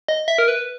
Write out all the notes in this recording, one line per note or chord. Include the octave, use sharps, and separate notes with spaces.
D#5
E5
A#4
B4